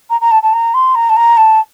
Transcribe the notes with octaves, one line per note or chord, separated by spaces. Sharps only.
A#5
A#5
A5
A5
A#5
C6
A#5
A5
A#5
A5